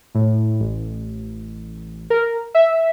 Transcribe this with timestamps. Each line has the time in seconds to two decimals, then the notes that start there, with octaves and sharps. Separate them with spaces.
0.15 A2
0.60 A1
2.10 A#4
2.55 E5